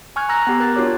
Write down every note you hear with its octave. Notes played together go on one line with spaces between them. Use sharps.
G#5 C#6 F6 F#6 G#6
A#5 E6 F#6 A#6
B3 G4
A#4 F#6 A6
D4 F4 F#4 A#4 C#5 D6